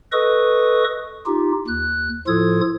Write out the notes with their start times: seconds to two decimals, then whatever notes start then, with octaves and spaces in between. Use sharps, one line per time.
0.12 A4 B4 D#5 C#6 D#6
1.26 D#4 F4 G4
1.68 D#2 F#6
2.27 A2 F3 F4 A4 D#6 G#6